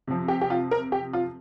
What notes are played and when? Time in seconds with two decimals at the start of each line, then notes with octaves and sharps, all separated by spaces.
0.07 C3 F3
0.28 G4
0.41 G4
0.50 F4
0.71 A#4
0.92 G4
1.13 F4